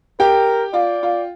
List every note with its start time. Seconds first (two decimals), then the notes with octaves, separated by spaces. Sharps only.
0.20 G4 A#4 G5
0.73 F4 D5
1.03 F4